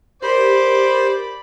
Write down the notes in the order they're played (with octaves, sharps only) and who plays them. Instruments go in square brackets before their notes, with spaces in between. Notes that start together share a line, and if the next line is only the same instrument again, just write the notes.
[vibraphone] G4 A#4 [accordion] C5 [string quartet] D5 B5